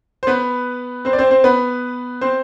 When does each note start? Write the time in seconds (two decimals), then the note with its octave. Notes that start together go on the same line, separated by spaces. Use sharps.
0.23 C5
0.27 B3 B4
1.05 C4 C5
1.13 D5
1.18 C4 C5
1.31 C4 C5
1.44 B3 B4
2.21 C4 C5